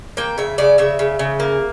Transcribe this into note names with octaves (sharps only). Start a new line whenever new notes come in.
A#3 G5
C#3 E5
C#3 D5
C#3 E5
C#3
C#3
A#3